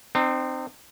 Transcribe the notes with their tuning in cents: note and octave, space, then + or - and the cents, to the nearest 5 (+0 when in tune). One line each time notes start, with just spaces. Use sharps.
C4 -10 D#4 -40